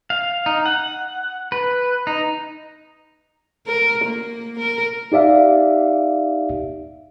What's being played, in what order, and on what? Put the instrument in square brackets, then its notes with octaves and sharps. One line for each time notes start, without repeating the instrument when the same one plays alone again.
[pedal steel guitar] F5
D#4
F#5
B4
D#4
[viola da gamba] A#4
A#3
A#4
[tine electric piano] D#4 G4 D5 E5 F5